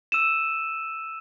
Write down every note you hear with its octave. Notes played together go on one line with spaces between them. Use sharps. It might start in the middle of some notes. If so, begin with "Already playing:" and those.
E6 D#7 E7